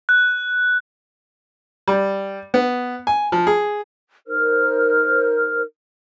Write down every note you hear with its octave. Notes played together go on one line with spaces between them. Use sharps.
F#6
G3
B3
G#5
F3
G#4
D#4 A#4 C5 F6